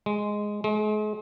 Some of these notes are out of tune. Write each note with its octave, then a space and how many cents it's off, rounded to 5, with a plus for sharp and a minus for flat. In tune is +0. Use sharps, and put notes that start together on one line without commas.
G#3 +0
G#3 +40